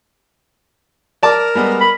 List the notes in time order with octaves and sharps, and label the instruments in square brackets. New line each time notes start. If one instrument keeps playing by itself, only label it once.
[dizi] A#4 [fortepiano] D5 A5 D6
[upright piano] G3 G#3 B3
[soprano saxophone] B5